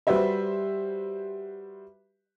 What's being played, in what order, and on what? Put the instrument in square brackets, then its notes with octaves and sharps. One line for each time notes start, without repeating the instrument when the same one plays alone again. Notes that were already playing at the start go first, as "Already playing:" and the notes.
[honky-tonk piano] G3 F#4 G4 B4 C5 E5